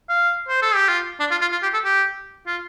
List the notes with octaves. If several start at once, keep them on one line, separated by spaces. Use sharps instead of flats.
F5
C5
A4
G4
F4
D4
F4
F4
F4
G4
A4
G4
F4